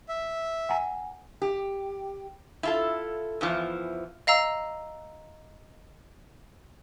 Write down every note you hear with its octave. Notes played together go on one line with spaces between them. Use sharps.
E5
F#5 G#5 A#5
G4
E4 F4 A4
E2 E3 F3
D#5 F5 A#5 E6